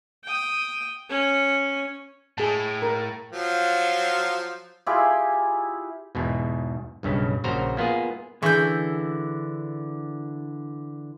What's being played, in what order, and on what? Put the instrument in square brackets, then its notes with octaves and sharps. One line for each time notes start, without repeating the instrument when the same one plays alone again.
[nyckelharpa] G5 D#6
C#4
[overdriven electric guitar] A2 [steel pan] G#4 A5
[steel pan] A#4
[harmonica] F3 F#3 F4
[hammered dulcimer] E4 F4 G4 G#4
[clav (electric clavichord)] E2 G#2 B2
B1 G2 C#3
A#1 C#3 F#4 C5 A#5
A#3 B3 F4 G#4
[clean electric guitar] D3 [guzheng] E3 [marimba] G#4 [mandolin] C#6 G6